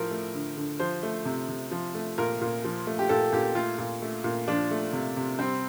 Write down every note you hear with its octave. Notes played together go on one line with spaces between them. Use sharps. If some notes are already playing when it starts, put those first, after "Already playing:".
Already playing: A2 F3 A#4
A3
D3
D3
F3 C5
A3
C3
C3
F3
A3
A#2 A#4
A#2
F3
A3
G4
A#2 A4
A#2 G4
A3 F4
A#2
A3
A#2
F3 D4
A3
C3
C3
G3 C4